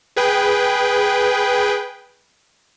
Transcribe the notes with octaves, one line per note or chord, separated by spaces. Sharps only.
G#4 B4 G5